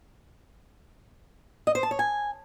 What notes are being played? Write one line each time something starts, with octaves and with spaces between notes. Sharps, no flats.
D#5
C5
A5
C#5
G#5